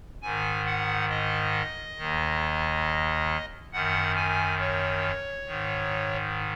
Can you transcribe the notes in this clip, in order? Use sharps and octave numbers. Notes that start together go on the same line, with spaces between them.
G#2 D#3 G#5
F#5
D#5
D#2 D#3
F#2 D#3 F#5
G#5
C#5
G#2 D#3